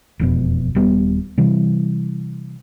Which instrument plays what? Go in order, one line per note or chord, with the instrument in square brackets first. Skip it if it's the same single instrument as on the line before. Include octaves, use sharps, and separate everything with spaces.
[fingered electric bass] E1 F2 B2
D#1 G3 B3
C3 E3 G3